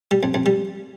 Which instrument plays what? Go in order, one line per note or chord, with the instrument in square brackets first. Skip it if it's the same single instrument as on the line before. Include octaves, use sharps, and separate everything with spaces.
[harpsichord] G3
F2
F2
G3